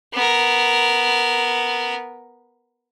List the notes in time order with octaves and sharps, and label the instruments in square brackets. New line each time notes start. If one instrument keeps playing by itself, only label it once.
[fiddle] B3 A#4